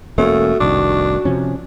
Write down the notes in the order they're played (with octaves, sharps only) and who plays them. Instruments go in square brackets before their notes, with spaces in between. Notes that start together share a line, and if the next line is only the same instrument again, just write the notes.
[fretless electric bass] E1 A#3 C#4 [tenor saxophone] A3 [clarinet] F#4
[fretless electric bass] F1 C2 D#3 [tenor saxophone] D4
[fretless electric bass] C3 F3 C#4